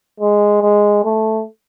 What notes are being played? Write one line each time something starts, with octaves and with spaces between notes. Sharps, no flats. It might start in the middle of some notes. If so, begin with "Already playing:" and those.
G#3
G#3
A3